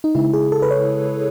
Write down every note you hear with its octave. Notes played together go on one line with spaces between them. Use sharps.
D#4
C#3 G#3 E4
G#4
A4
B4
C#5